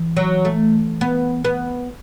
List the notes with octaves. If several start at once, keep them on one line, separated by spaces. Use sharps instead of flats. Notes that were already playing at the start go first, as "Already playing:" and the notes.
Already playing: E3
F#3
A3
B3
B3